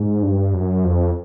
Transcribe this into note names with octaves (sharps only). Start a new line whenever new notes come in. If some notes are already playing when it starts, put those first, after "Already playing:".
Already playing: G#2
G2
F#2
F2